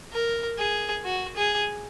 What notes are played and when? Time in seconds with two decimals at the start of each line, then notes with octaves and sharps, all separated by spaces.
0.13 A#4
0.59 G#4
1.05 F#4
1.37 G#4